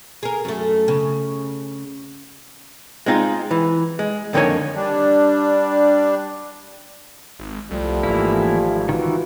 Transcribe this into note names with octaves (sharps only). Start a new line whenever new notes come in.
G#4 A#4
F#2 A3
C#3
G#3 C4 D#4 F4
E3
G#3
F2 D3 D#3 A#3 C#5 G#5
G3 D4
G#1
C2 F3 G3 A3
G#1 E3 A#3 E4
D#3 E3 F4 F#4 B4